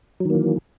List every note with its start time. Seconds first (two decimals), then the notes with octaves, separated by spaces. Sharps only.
0.20 F#3
0.25 D#3
0.30 A#3
0.35 E3